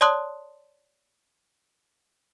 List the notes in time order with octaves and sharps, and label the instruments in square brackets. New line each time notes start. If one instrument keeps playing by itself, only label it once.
[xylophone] C#5 D5 A5 C6 D#6 F#6